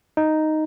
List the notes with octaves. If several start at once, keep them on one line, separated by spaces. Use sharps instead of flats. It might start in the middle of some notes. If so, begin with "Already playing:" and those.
D#4